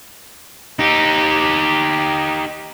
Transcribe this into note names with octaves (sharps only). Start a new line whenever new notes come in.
D#4 G4